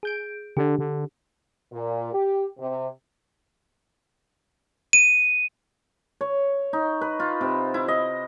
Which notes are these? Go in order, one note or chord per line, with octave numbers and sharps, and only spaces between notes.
G#4 G6 D7
D3 D4 G4
D3
A#2
G4
C3
D#7
C#5
D#4
B4
F4
C3
E4
D#5